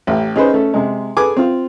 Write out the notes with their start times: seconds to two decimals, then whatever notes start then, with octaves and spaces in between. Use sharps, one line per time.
0.07 A1 G4
0.36 C#4 D#4 G#4 B4 C5
0.53 A3 C#4 A4
0.74 C3 G#3
1.17 G#4 A4 B4 G#5 D6
1.37 C4 F4